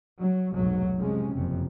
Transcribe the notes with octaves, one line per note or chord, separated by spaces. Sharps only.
F#3
F1 B1 G#2 F#3
C3 F3 G#3 C#4
F#1 F2 C3